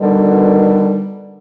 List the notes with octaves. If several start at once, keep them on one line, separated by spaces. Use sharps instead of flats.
B2 D3 D#3 G3